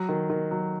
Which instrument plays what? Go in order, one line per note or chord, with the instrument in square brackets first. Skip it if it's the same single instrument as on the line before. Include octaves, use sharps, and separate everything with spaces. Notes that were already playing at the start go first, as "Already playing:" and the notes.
Already playing: [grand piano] F#3
D#3
D#3
F#3